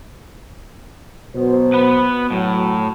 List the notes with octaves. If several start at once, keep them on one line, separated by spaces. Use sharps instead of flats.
B2 F#3 C5
B3 B4
A2 F#3